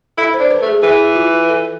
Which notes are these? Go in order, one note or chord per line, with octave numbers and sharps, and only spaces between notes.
E4 A4
C5
D4
B4
A3
G#4
E3 G#4
F4
A4